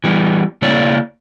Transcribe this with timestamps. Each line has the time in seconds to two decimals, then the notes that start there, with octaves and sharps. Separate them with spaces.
0.04 E3 G3 B3
0.62 C#3 A#3 E4 C#5 D5